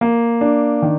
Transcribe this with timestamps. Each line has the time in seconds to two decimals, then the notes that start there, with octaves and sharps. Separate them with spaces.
0.01 A#3
0.41 D4
0.82 D#3